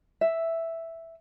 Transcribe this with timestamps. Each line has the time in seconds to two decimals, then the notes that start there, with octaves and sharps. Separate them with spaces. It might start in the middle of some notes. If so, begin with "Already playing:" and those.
0.21 E5